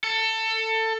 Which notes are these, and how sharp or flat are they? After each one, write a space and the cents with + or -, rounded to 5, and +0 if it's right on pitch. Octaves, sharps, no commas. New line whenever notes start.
A4 +20